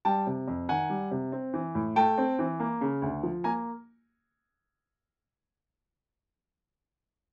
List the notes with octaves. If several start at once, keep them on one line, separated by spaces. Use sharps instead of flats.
G3 G5 A5
C3
F2
D#3 F#5 G#5
G3
C3
C4
E3
A2
A3 G5 A5
C4
E3
A#3
C#3
D2
F3
A#3 G#5 A#5